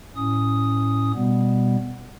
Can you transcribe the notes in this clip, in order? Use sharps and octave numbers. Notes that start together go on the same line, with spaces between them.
A2 C#4 D#6
B2 G3 B3